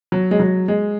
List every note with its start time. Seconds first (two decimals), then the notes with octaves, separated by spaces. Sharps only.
0.12 F#3
0.31 G#3
0.40 F#3
0.68 G#3